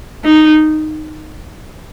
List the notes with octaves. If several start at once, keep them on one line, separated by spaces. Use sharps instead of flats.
D#4